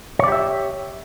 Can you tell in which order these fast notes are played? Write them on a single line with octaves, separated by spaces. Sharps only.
C#5 D5 G4 E5